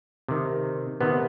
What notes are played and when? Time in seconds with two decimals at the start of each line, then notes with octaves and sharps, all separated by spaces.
0.28 C3 D#3
1.01 C3 D#3 B3